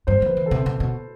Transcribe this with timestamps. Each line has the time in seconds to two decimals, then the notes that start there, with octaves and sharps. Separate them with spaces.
0.07 G2 C5
0.22 F3 B4
0.37 E3
0.46 A4
0.51 C3
0.66 C3
0.80 B2